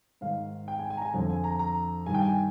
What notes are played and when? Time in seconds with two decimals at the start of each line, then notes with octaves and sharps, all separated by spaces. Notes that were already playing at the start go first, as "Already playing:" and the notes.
0.21 G#2 D#3 F5
0.68 G5
0.79 G#5
0.90 G#5
0.97 A#5
1.02 G#5
1.13 F2 D3 G#5
1.30 G#5
1.44 A#5
1.59 A#5
2.06 G2 D#3 G#5
2.14 G5
2.22 G#5